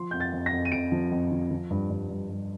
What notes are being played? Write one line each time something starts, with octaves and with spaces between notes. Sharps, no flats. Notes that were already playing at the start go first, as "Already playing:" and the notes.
Already playing: F3 C6
F2 G6
A6
F2
A#6
F2
D#7
F2 D7
F3
F2
F3
F3
G2
G2
G2
G2